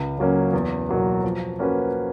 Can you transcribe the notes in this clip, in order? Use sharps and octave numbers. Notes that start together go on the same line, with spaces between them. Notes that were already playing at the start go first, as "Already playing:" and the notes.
Already playing: C#2
C#3 F#3 A#3 C#4
E2
B2 F#3 A#3
F3
A#3 C#4 F#4 B4